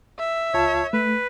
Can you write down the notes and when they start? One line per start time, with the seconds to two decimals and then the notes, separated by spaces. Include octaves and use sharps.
0.19 E5
0.54 C#2 F4 C#5 A5
0.93 A3 B4